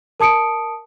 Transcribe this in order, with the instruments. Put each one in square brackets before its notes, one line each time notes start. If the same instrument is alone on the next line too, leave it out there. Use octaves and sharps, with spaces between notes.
[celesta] A#4 A5 D#6 C#7 D7